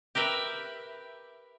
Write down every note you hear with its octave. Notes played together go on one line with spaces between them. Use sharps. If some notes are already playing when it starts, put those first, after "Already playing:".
G4 A#4 B4 E5